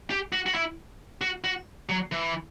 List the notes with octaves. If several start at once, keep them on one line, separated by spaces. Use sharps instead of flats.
G4
F#4
F#4
E4
F#4
F#4
F#3
E3